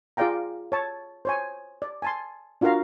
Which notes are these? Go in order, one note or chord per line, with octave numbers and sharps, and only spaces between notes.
F4 G#4 D5 F5 G5 A#5
C#5 A5
C5 C#5 G#5
D5
G#5 A5 C6
D4 F4 F#4 A#4 F5 A#5